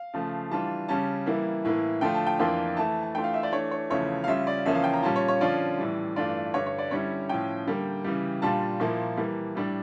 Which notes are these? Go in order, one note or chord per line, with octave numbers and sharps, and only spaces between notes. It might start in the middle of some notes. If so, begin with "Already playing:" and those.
Already playing: F5
C#3 F3 A3
E3 G3 D4 F4 A5
C#3 G3 C#4 A5
E3 G3 A#3 E4
A2 E3 A#3 E4
D3 F3 A3 D4 F4 G5
A5
G5
F2 E3 A#3 D4 F4
E3 A3 E4 A5
A5
E3 A3 D4 F4 G5
F5
E5
D5
E3 A3 D4 C#5
C#5
E2 C#3 F3 A3 E4 C#5
F5
C#3 G3 C#4 F4 E5
D5
E2 C#3 F3 A#3 C#4 E5
F5
G5
A#5
A#2 G3 C#4 F4 A5
C#5
C#5
D3 F3 C#4 F4 D5
A2 E3 G3
G2 E3 A3 D4 F4 D5
G2 D3 G3 C#5
C#5
D5
D3 G3 C#4 E4 C#5
A2 F3 C#4 G5
D3 G3 A#3
C#3 E3 G3
A#2 G3 D4 F4 A5
A#2 F3 A#3 E4
E3 G3 A#3
A2 G3 D4